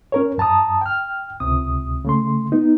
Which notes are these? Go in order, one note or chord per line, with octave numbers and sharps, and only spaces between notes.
C#4 A#4 C#5
F#2 A5 A#5 D#6
G5 F6
C#2 C3 D#6
C#3 A3 C6
B3 D#4